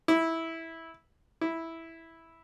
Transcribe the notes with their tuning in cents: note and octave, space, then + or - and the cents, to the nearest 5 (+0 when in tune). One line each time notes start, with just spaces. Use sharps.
E4 -10
E4 -5